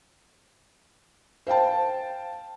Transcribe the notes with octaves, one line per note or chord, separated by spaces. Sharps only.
C5 F5 G5 A5